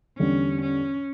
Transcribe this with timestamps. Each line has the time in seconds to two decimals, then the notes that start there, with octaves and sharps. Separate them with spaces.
0.19 E2 D3 G3 C#4
0.62 C#4